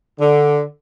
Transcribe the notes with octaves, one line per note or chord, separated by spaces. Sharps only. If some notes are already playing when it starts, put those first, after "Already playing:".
D3